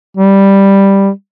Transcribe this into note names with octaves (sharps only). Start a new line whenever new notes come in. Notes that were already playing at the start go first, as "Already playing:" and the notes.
G3